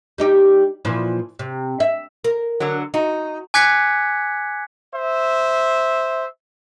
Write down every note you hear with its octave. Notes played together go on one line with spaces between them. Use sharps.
G3 D#4 G4
A#2 E3 F3
C3
E5
A#4
D3 F#3
D#4 F#4
G#5 D6 F#6 G#6 B6 C#7
C5 E5